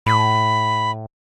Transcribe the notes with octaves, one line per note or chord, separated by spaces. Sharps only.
A2 B5